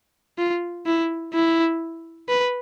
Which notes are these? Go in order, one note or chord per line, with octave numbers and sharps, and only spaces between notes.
F4
E4
E4
B4